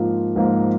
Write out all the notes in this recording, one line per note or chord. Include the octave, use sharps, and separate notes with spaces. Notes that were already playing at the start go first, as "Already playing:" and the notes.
Already playing: G#2 F3 A#3 F4
G#2 F3 A#3 F4